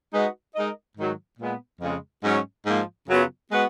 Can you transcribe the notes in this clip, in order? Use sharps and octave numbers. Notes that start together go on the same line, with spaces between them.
G#3 D#4 F#4 B4 D#5
G#3 D#4 A#4 D#5
G#2 D#3 F#3
A#2 G#3 B3
F2 C#3 G#3
G#2 F#3 C#4
G#2 F3 A#3
F#2 C#3 F#3 B3 F4
G#3 B3 F#4 B4